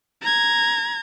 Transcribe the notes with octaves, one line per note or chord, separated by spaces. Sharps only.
A#5 G#6